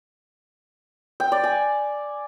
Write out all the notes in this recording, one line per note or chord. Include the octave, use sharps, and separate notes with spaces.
G5
D5
G#5